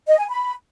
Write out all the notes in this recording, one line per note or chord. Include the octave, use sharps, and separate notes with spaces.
D#5
G#5
B5